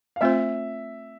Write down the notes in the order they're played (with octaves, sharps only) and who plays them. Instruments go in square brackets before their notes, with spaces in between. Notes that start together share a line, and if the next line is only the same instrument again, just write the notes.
[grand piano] F5
[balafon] A3 C4 F4 C5 [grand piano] E5